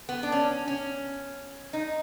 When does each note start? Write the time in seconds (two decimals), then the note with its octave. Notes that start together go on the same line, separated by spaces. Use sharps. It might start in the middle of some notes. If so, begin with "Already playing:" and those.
0.09 B3
0.23 D4
0.32 C#4
0.68 C#4
1.73 D#4